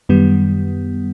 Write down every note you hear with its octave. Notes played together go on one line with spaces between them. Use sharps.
F#2 D#3 G3 B3